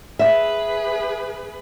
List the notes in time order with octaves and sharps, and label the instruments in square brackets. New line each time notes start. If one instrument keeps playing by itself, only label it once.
[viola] G#4 B4 [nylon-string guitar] E5